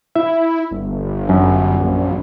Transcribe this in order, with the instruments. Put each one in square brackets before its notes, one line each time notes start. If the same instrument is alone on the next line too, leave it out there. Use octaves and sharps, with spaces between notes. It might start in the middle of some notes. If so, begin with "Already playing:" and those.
[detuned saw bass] E4 [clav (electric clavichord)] E5
[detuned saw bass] G1
[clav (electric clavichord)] F#2
[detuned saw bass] A#1